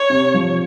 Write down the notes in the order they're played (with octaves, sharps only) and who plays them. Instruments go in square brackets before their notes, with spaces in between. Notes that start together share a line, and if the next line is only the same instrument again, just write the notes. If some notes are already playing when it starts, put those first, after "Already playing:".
Already playing: [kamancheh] C#5
[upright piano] C3
F3